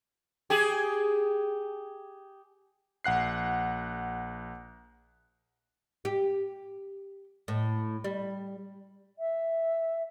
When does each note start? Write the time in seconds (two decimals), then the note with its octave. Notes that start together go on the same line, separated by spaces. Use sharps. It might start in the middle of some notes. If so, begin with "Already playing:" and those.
0.50 G4 G#4
3.04 A#1 F#5 F#6 C7
6.05 G4
7.48 A2
8.04 G3
9.19 E5